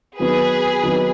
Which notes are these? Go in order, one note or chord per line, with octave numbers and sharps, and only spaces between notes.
D#3 F#3 B3 D#4 G#4 B4
D#3 F#3 B3 D#4